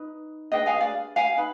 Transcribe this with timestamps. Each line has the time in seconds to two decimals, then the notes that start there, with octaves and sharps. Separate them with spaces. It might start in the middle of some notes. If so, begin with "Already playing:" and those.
Already playing: D#4 B4
0.52 D4 G#4 B4 D#5 G5
0.66 F5 G#5
0.81 D5 F5
1.16 F5 G#5
1.37 D#4 B4